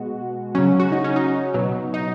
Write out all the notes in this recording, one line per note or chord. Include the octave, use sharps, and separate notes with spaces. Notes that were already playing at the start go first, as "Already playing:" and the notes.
Already playing: B2 G#3 F#4
C#3 F#3 C#4
F#4
D#4
C#4
D#4
B2 F#3
D#4